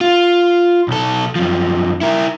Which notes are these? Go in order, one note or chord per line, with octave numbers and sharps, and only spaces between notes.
F4
B1 A4
F#2 F3
E4 A#4